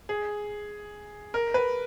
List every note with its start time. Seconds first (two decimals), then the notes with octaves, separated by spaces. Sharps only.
0.09 G#4
1.34 A#4
1.54 B4